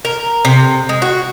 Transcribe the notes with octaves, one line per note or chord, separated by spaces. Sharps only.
A#4
C3
G#3
F#4